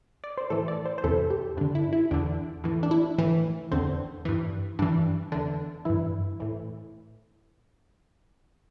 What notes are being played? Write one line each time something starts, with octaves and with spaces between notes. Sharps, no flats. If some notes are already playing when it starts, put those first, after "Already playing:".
D5
C5
A2 E3 A4
D5
C5
C5
E2 C3 E3 A4
G4
G2 D3 D4
E4
E4
E2 D3 D4
A2 E3
D4
E4
A2 E3
E2 D3 C4
G2 E3
G2 E3 D4
E2 D3 D4
G2 E3 E4
A2 E3